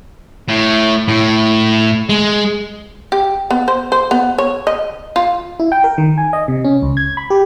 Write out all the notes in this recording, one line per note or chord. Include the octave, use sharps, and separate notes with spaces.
A2
A2
G#3
G4
B3
C5
C5
B3
C#5
D#5
F4
E4
G5
A#4
D#3
G#5
D#5
C3
C#4
C#2
G#6
B5
G4